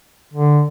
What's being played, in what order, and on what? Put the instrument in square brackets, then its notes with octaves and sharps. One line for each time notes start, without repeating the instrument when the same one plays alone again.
[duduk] D3